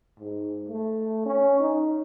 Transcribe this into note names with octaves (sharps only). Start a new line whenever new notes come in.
G#2
A3
C#4
D#4